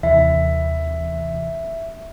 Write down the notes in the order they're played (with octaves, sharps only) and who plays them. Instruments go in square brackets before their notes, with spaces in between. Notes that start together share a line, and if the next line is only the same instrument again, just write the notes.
[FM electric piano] D#2 C3 E3 [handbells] E5